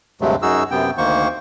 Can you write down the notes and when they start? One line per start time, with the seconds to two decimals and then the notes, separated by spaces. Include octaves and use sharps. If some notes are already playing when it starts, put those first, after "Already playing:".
0.21 D2 G2 C3 F#3 G#3 A3
0.42 F#2 D#4 F#4 G#4 E6
0.71 F#2 C3 B3 G5
0.98 D2 D#3 A#3 C5 C#6